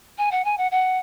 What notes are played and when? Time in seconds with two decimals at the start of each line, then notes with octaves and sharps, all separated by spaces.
0.18 G#5
0.31 F#5
0.44 G#5
0.57 F#5
0.71 F#5